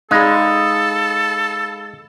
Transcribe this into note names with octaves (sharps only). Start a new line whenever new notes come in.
G#3 D#4 G#4 A4 F5 B5